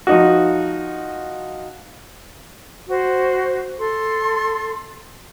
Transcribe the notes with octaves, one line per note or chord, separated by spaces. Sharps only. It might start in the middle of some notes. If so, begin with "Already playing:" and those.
F3 D#4 F#4
F#4 C5
A4 C6